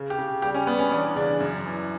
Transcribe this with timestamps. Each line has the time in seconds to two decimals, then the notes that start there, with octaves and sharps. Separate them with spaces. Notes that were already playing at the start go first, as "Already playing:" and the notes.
Already playing: C#3
0.10 G4
0.18 C#3
0.42 G3 G4
0.54 C#4
0.67 G3 B3
0.79 C#4
0.92 E2 D4
1.16 C#3 D4
1.40 F#2
1.66 E3